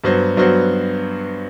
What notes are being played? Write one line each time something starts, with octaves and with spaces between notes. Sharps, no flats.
G2 F#3 B3 F#4 C5
G2 F#3 B3 F#4 C5